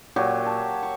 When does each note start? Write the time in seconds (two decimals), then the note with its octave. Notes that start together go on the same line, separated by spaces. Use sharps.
0.16 A#2 F#3 G4 C#5
0.46 A5
0.83 C#6